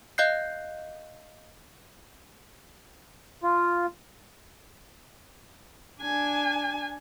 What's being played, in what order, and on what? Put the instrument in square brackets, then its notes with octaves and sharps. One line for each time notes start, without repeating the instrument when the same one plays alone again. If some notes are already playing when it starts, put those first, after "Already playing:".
[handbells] D#5 F5 F#6 G6 C7
[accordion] F4
[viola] D4 G#5